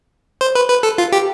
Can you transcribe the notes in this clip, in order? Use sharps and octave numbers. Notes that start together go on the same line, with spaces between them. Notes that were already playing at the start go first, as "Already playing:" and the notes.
C5
B4
B4
A4
F4
G4